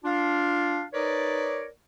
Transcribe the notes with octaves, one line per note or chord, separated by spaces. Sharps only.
D4 F4 F5
D#4 A#4 B4 C#5 D5